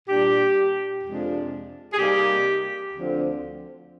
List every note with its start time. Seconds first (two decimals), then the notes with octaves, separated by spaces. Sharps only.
0.09 A#2 G3 D4 G4
1.04 F2 C3 F3 G#3 D4
1.93 G#4
1.98 C3 G3 A#3 D#4 G4
2.93 D2 D3 F3 C4